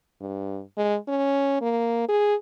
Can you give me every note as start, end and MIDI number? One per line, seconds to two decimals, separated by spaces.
0.21 0.61 43
0.77 0.96 56
1.08 1.59 61
1.61 2.08 58
2.08 2.35 68